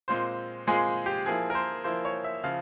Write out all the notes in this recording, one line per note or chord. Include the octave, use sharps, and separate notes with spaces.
A#2 G#3 C4 F4 C5
A#2 G#3 C4 F4 G#4
G4
F3 A#3 E4 G#4
A#4
C5
F3 A#3 E4 C5
C#5
E5
C#3 F3 F5